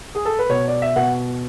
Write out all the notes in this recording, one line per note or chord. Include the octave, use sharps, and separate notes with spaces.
G#4
A4
B4
B2 C#5
D5
E5
B2 F#5